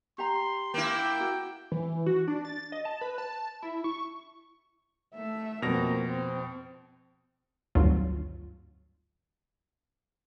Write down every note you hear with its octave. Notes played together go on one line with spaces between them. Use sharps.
G4 A#5 C6
A#3 E4 G5
F#4
E3
F#4
D4
A6
D#5
A5
B4
A5
E4
C#6
A3 E5
F2 B2 A#3 C4 A#6 F7
C4
G#1 D2 G2 F#3 F4